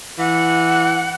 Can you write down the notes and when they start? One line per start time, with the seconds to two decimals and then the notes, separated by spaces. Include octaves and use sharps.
0.19 E3 F#5